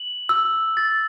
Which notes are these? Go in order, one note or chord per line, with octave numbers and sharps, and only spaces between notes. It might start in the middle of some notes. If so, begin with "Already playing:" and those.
Already playing: F#7
E6
A6